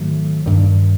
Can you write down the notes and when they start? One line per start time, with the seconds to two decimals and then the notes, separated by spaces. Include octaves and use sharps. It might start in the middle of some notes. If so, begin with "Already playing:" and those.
Already playing: G#2 D#3 F#3 A3
0.46 G2 D#3 G3